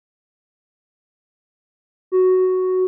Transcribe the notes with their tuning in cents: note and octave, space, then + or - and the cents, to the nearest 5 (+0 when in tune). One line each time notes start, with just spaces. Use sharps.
F#4 +5